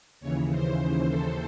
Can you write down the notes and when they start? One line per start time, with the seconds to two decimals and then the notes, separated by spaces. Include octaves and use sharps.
0.21 D#2 C#3 E3 C#5
0.50 C5
0.79 C5
1.07 A4